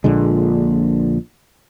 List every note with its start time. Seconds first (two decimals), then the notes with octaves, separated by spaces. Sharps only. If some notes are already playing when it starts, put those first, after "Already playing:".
0.04 A#1 A#2 D3 G#3